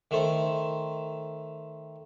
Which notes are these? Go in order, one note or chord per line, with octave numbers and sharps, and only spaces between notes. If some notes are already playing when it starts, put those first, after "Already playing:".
D#3 A3 C5